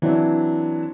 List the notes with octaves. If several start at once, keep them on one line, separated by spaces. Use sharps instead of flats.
E3 F#3 C4 D4